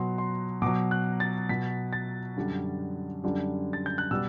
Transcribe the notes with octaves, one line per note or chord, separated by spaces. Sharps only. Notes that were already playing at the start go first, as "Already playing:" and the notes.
Already playing: B2 F#3 C6
C6
B2 F#3 D6
F#6
A6
B2 F#3 B6
A6
F#2 D3 G3
F#2 D3 G3
A6
G6
F#6
B2 G3 E6